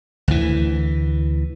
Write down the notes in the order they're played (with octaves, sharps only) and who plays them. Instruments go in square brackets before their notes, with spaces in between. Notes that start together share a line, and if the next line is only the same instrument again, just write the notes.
[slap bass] D2 E3